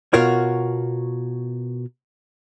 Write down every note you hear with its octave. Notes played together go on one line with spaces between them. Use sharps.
B2 F4 F#4 A#4 C#5